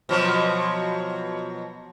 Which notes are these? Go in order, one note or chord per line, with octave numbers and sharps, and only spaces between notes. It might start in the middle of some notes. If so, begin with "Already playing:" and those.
B2 F3 F#3